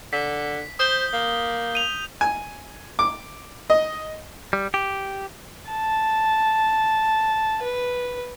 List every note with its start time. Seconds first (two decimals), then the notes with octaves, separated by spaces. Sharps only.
0.13 D3 B6
0.79 C5 D#6 G6 G7
1.13 A#3
1.75 D#7 F7
2.21 G#5
2.99 D6
3.70 D#5
4.53 G3
4.74 G4
5.70 A5
7.63 B4